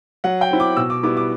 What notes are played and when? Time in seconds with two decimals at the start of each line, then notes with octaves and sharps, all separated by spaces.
0.24 F#3 F#5
0.41 G5
0.50 C4 E4
0.60 D6
0.77 B2 E6
0.90 D6
1.03 G3 B3 E4 D6
1.17 D6